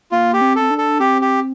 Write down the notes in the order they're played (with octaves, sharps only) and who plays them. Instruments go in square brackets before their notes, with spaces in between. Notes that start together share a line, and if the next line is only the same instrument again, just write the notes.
[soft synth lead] A#3 [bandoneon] F4
[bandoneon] G4
[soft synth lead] C4
[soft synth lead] C4 [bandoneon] A4
[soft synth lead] D4
[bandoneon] A4
[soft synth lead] C4 [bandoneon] G4
[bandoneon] G4